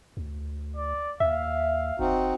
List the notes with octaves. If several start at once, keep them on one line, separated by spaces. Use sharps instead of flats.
D2
D5
D#2 E5 F5
F#1 C4 D#4 F#4